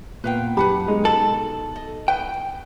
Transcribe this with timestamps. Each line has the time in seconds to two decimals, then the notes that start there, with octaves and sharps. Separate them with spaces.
0.24 A#2 B3 B4 F5 G5
0.57 F#2 G4 B4 F#5 A5 B5
0.88 B2 G#3 D#4
1.05 A4 A5 F#7
1.76 D#5
2.08 B4 G5